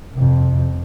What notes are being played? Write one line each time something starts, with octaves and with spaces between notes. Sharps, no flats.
F2 C3